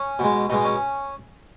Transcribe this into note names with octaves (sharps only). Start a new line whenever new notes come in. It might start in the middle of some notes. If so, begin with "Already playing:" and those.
Already playing: C#4
B2 G#3
B2 G#3 D#4
C#4